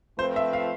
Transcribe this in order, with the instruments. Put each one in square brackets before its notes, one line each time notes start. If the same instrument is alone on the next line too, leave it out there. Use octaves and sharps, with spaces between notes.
[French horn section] F3 A3 C4 F4 B4 [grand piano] C5
[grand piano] E5
F5